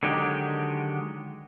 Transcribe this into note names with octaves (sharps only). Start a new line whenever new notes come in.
D3 D#3 F#3 G#3 G4